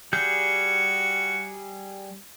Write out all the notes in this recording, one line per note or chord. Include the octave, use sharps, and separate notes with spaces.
G3 F#4 G#4 G6